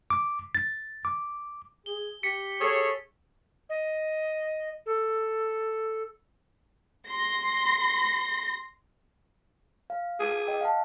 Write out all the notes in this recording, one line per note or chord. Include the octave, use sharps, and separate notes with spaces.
D6
A6
D6
G#4 G7
G4 B6 C#7
G#4 A4 C#5
D#5
A4
C6 A#6
F5
G#4
D#5 G5
F5 F#5 A5